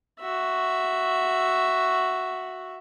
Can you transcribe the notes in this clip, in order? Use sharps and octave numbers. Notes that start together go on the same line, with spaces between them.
F#4 E5